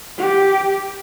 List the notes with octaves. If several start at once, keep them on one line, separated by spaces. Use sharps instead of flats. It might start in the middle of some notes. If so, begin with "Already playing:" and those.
G4